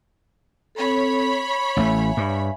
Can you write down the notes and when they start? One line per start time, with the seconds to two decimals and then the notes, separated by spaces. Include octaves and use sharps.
0.75 C4 A4 C#5 B5
1.45 C#6
1.77 A1 A3 E5 F5 G#5
2.17 G2